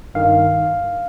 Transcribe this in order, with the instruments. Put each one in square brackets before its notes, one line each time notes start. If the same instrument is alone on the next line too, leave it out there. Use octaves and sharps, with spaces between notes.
[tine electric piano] G2 D#3 F5